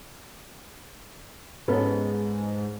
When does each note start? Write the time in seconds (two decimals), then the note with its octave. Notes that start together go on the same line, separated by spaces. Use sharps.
1.68 G#2 B3 C#4 A4